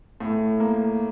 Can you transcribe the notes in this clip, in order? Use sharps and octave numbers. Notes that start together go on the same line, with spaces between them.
A2
A#3